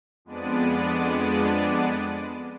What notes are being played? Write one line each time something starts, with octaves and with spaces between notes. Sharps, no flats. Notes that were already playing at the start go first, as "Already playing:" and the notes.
F2 G#3 B3 D4 D5 D#7